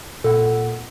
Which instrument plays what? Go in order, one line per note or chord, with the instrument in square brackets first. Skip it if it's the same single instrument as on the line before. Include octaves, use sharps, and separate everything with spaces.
[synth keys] A#2 F#5 [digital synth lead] A4